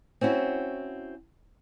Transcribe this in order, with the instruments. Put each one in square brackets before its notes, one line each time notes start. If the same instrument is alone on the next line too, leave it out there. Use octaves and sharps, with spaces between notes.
[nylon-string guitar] C4 C#4 E4 F#4